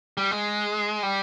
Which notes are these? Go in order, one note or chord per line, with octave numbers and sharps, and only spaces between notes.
G3
G#3
G3